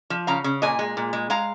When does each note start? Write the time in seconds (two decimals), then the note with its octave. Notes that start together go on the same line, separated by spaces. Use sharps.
0.10 F3
0.27 C#3 F5 A#5
0.44 C#3
0.62 A#2 D#5 G#5
0.79 G#3
0.97 A#2
1.13 G#3
1.30 G#3 F5 A#5